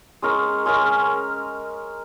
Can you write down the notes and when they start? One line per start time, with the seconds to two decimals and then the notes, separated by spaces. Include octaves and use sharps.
0.22 G#3 C#4 A#4
0.66 G#3 C#4 A#4